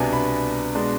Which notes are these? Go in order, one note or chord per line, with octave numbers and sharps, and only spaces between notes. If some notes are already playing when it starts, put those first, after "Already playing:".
Already playing: C2 B2 B3 D4 G#5
B5
B2 G#3 B3 D4